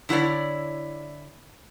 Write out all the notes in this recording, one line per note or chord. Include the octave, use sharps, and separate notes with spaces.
D3 E4 F#4 C#5 D5